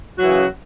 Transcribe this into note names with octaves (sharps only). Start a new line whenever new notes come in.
F#2 C#3 E3 F#3 F#4